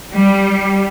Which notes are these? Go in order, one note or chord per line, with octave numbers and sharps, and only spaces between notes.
G3